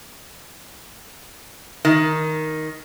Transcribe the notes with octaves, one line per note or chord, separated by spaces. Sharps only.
D#3